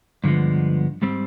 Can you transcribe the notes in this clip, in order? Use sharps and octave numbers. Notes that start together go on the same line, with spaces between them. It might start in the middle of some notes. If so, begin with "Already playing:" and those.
G2 D3 F3 G#3 B3
G#2 G3 C4